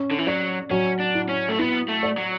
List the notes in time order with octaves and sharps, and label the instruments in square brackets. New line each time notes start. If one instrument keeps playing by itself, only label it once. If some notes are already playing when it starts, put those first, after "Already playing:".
Already playing: [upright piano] C#4
[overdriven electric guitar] D3
E3
[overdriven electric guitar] F#3 [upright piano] D5
[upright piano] F#3 [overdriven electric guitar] C#4
[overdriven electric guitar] D4
[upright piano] E4
[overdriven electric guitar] C#4
A3
[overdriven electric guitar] B3 [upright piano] E4
[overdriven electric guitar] A3
[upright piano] D5
[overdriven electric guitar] F#3